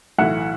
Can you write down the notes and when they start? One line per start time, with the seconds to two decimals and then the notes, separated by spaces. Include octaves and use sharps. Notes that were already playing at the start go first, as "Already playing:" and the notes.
0.18 B1 A2 E3 E5 F#5